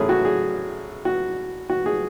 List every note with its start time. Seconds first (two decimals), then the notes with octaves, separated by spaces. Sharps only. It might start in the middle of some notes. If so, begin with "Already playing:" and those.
Already playing: A1 A2 F#3 A3 C#4 G#4
0.09 F#4
0.25 G#4
1.05 F#4
1.70 F#4
1.86 G#4